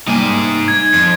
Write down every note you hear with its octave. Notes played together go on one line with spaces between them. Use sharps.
C3 G3 A#3 D#4 G#5
G#6
F2 C6